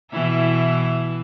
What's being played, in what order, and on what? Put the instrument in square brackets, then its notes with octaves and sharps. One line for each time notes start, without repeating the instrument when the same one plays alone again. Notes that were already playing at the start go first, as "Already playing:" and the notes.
[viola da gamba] B2 E3 E4